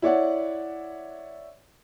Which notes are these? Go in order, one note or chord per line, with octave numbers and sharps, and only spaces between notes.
E4 C#5 D5 F#5